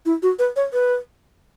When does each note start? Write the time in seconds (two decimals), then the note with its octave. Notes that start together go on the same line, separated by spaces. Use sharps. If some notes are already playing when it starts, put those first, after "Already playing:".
0.06 E4
0.23 F#4
0.39 B4
0.56 C#5
0.73 B4